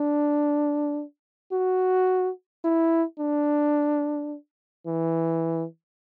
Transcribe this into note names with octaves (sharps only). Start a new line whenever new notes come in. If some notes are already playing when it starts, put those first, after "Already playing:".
Already playing: D4
F#4
E4
D4
E3